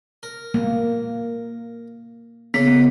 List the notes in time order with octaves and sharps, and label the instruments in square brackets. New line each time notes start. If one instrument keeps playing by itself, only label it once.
[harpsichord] A#4
[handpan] A#3
[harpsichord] C#3 A#3 [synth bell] B3 [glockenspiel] B6